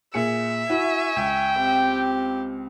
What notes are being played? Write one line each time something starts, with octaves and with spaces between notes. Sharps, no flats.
A#2 G#4 E5 C#7
E4 F#4 G#5 C#6
C#2 G5
C4 G4